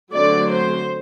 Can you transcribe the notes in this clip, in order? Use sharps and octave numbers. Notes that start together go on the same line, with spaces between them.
D3 F#3 A3 C4 D5
C5